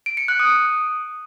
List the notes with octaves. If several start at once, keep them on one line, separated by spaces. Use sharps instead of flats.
D7
C#7
F#6
D#6